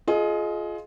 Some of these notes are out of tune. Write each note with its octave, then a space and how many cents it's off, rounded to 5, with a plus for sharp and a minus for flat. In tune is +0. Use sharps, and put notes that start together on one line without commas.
F4 +0 G#4 +30 D#5 +0